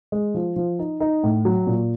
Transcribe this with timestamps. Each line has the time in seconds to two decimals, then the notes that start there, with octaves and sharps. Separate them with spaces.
0.12 G#3
0.34 F3
0.56 F3
0.79 D#4
1.00 D#4
1.24 A2
1.45 F#3
1.67 A#2